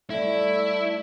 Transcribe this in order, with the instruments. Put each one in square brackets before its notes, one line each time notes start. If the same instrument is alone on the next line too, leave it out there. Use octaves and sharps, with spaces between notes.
[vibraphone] G3 D5 [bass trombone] A3 [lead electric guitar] E4